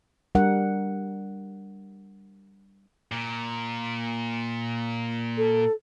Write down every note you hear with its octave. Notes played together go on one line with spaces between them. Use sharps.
G3 D4 A#4 F#5
A#2
A4